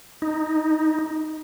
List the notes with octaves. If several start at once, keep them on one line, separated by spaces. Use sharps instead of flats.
D#4